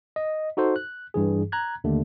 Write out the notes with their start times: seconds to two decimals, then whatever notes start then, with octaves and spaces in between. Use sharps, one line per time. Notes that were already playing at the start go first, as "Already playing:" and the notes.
0.16 D#5
0.57 D#4 F#4 A4 C5
0.76 F#6
1.14 G2 E3 G#4
1.52 A#5 F#6 G#6
1.84 D#2 D3 A3